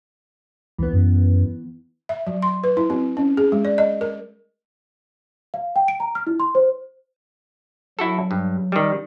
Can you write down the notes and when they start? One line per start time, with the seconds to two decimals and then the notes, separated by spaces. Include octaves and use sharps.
0.78 C#2 E3 B3
0.93 F#2
2.09 E5
2.27 F#3
2.42 C6
2.64 B4
2.77 E4
2.90 C4
3.17 C#4
3.37 G#4
3.52 G#3
3.65 D5
3.78 D#5
4.01 A#4
5.54 F5
5.76 G5
5.88 D7
6.00 A#5
6.15 F6
6.27 E4
6.40 C6
6.55 C5
7.99 F#3 E4 F#4 A4
8.31 G2
8.72 D#3 G3